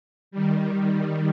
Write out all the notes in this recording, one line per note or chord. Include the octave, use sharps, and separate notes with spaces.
D#3 G3